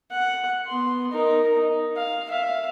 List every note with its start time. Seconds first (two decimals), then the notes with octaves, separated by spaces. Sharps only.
0.11 F#5
0.67 B3 C6
1.12 D#4 A#4
1.54 D#4
1.97 F5
2.28 E5 F5